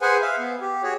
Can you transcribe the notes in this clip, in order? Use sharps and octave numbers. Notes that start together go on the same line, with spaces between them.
G#4 B4 C5 F#5 G#5
E5 F5
B3
G4
F#4 G#4 C#5